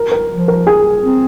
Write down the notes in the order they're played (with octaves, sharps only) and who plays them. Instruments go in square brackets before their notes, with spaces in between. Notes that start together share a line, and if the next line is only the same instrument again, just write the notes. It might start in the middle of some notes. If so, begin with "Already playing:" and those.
Already playing: [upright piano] A#4
A#4
[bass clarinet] F3
[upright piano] A#4
G#4
[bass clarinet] C4